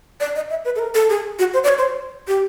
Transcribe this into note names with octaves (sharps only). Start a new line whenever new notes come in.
D5
D#5
E5
B4
A4
A#4
A4
G#4
F#4
C5
D5
C#5
C5
G4